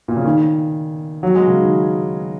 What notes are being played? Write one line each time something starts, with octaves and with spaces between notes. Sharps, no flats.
A#2
C#3
D#3
F#3
G#3
C#3
D#3